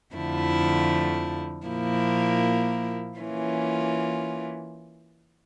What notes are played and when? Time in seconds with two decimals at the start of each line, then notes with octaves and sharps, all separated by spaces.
0.15 F2 D3 F3 A3 E4
1.67 A#2 F3 A#3 E4
3.20 E3 A#3 C#4 F4